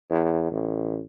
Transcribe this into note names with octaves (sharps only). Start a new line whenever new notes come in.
E2
A1